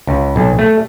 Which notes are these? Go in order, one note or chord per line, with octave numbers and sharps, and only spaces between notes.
C#2
B1
A3